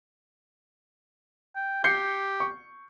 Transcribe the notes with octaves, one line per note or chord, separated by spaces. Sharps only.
G5
G4 G6 C7 C#7
C#6